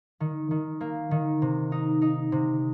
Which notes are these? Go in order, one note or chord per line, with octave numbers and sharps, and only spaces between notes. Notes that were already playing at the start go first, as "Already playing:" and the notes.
D#3
D#3
A#3
D#3
C3
D#4
D#4
C3